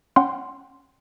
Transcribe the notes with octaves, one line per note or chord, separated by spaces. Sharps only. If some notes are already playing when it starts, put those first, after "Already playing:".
C#4 F#5 G5 C6